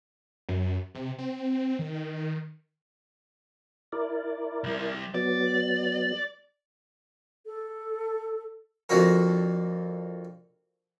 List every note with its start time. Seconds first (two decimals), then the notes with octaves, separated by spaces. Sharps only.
0.49 F#2
0.95 C3
1.18 C4
1.79 D#3
3.92 E4 A#4 D5
4.64 C2 G3
5.14 F#3 B3 D5
7.46 A4
8.89 F2 D3 A#3 F#4 A#4